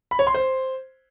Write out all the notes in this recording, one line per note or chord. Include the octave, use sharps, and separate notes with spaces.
B5
C#5
C6
C5